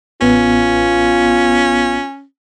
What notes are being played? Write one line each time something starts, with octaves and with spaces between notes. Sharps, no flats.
A1 B3 C#4 F4